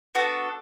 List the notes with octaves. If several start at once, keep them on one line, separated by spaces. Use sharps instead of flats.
B3 D4 F#4 A4